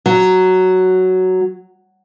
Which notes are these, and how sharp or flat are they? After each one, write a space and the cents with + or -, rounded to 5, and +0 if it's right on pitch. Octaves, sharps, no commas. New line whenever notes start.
F#3 +5